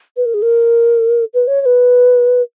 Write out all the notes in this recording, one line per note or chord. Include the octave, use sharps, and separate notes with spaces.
B4
A#4
G#4
A#4
B4
C#5
C#5
B4